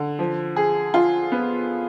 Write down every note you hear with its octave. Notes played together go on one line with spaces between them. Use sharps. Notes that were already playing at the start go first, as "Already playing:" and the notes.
Already playing: D3
F3
G#4
F4
B3